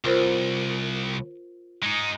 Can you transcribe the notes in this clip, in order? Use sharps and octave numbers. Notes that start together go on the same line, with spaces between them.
C2 F4 A#4 C5
G#3 D#4